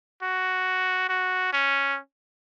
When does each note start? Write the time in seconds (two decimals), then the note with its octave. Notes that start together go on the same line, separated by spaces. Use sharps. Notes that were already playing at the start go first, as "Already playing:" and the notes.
0.22 F#4
1.09 F#4
1.53 C#4